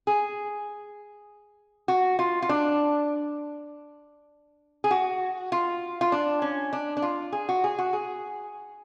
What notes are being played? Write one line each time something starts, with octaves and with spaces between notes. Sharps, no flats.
G#4
F#4
F4
F4
D4
G#4
F#4
F4
F4
D4
C#4
D4
D4
F4
G#4
F#4
G#4
F#4
G#4